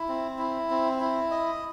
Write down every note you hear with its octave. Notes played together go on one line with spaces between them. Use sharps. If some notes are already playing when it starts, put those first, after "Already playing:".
Already playing: E4
C4
E4
C4
E4
D#5